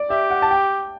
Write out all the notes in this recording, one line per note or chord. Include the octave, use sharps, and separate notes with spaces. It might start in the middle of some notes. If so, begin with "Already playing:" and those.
Already playing: D5
G4 E5
F#5
A5
G5